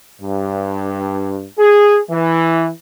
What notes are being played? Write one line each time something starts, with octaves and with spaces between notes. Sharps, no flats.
G2
G#4
E3